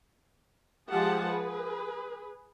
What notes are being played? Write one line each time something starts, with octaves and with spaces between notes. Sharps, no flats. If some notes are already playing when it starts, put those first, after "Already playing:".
F3 G#3 G4 G#4 F#5 A5
G#4 B4